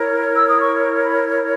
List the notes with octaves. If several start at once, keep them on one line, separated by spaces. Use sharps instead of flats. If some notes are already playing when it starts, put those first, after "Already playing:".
Already playing: E4 A#4 C#5
E6
D#6
C#6
B5